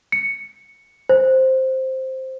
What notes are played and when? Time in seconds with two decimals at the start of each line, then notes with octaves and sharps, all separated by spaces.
0.12 C#7
1.09 C5